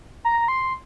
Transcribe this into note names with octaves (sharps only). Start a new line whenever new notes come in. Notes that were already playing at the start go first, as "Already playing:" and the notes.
A#5
C6